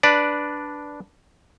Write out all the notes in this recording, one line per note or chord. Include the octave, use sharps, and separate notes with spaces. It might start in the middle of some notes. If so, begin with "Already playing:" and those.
D4 B4 D5